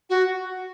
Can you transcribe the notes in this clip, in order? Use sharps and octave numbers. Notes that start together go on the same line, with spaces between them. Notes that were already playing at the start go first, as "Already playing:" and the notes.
F#4